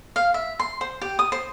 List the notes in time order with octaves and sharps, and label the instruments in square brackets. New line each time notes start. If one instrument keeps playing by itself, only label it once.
[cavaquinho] F5
E5
C6
C5
G4
D#6
C5